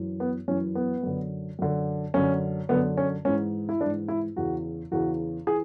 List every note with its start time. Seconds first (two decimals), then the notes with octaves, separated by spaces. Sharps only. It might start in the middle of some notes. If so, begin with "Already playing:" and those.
Already playing: F#2 E3
0.20 B3
0.48 F#2 E3 C#4
0.75 B3
1.03 F#2 D3
1.59 F#2 D3
2.14 F#2 D3 C#4
2.69 F#2 D3 B3
2.97 C#4
3.25 G#2 E3 C#4
3.69 E4
3.81 E3 D4
3.85 G#2
4.08 E4
4.36 E2 C#3 E3 F#4
4.92 E2 C#3 E3 F#4
5.47 E3 G#4